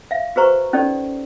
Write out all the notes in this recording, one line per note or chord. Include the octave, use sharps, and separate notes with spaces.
E5 F5
F#4 G#4 B4 C5 A#5 C#6
C#4 D#4 G4 A4 D5